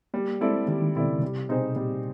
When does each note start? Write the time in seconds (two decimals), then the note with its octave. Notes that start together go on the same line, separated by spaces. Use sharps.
0.14 G3 A#3
0.41 G#3 C4 E4 A4 D5
0.68 D#3 G3
0.81 D#3
0.95 B2 C4 E4 A4 D5
1.08 C#3
1.22 C3 G3
1.49 B2 C4 D#4 G#4 C5
1.76 A#2 G3